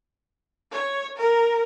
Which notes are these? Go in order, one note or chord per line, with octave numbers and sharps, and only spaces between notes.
C#5
A#4